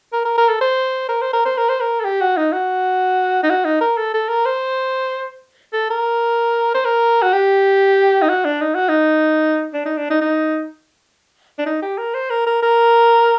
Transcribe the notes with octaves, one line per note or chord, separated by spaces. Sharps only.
A#4
A#4
A#4
A4
C5
A#4
C5
A#4
C5
A#4
C5
A#4
A4
G4
F#4
D#4
F#4
D#4
F#4
D#4
A#4
A4
A4
A#4
C5
A4
A#4
C5
A#4
F#4
G4
D#4
F#4
D4
D#4
F#4
D#4
D4
D#4
D4
D#4
D#4
D4
D#4
G4
A#4
C5
A#4
A#4
A#4